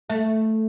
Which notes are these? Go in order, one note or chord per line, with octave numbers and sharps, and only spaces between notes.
A3